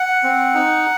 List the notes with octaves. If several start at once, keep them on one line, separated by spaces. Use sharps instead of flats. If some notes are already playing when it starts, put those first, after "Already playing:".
Already playing: F#5
C4
D#4